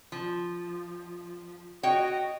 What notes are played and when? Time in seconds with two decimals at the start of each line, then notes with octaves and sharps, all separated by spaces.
0.12 F3
1.83 F#4 C#5 D#5 G5